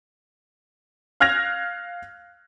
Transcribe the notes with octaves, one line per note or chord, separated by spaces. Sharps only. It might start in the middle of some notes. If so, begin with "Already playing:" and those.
F5 F6 F#6 G#6 A#6 F7